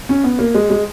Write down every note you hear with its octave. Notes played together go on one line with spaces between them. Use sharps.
C#4
B3
A#3
G#3
G#3